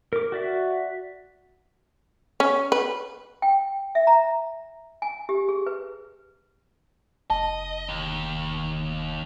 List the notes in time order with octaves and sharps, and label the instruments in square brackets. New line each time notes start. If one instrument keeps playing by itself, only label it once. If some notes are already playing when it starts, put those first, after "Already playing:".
[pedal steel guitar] A#4 D6
F#4 D5 E5
[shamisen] C#4
B4
[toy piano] G5
E5
A#5
G#5
G4
G#4
B4
[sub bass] F1 [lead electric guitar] D#5 [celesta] A5
[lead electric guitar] D#2